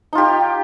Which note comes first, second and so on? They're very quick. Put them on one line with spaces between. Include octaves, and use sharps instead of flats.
D#4 F4 G4